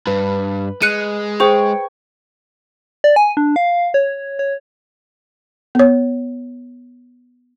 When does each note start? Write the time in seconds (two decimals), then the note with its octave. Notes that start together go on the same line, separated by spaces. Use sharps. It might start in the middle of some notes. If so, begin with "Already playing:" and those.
0.07 G2 B4
0.82 G#3 F#6 C#7 D#7
1.40 G#4 C5 C#5 G5 C#6
3.04 D5
3.16 G#5
3.37 D4
3.56 F5
3.94 C#5
4.39 C#5
5.75 B3 C#5